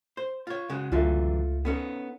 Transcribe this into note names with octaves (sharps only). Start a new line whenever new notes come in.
C5
F4 C#5
C#3 G#3 F#4
C#2 F#2 D3 E3 A3 F4
B3 C#4 D#4 A4